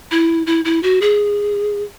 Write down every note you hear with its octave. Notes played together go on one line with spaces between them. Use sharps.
E4
E4
E4
F#4
G#4